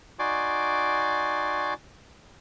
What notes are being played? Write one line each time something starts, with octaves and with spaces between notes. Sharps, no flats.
D#4 F#4 D5 G#5 C6 D6